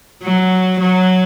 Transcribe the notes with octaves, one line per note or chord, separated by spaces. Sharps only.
F#3
F#3